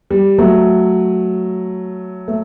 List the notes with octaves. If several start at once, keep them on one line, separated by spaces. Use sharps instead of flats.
G3
F#3 A3
A3